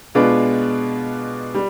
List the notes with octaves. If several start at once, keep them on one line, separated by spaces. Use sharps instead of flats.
B2 G#3 D4 F4 B4
G3